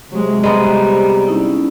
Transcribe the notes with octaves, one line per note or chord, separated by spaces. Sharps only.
C3 F#3 G#3
G3 G#3 B3 G4 A#5 B5
C#4 D#4 E4